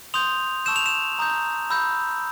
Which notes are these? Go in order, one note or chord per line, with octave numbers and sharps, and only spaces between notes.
C6 D#6 G6 F7
A5 C#6 E6 G6 E7
F7
E7
A#5 D#6 G6
B5 E6 G6